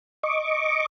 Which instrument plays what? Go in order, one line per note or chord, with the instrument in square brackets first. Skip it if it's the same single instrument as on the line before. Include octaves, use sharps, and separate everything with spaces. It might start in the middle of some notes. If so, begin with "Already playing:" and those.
[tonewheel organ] D#5 C#6 D6